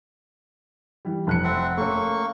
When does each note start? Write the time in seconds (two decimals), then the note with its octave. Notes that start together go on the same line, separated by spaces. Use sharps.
1.05 E3 G3
1.27 F1 F#6 C#7
1.44 C4 E5 F#5
1.77 A3 A#3 C#4 C#6